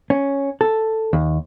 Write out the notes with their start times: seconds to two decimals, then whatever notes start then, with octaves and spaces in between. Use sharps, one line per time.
0.10 C#4
0.61 A4
1.13 D#2